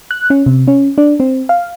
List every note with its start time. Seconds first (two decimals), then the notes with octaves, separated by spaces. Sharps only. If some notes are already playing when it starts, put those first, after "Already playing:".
0.11 F#6
0.30 C#4
0.46 C3
0.68 C#4
0.98 D4
1.20 C4
1.49 F5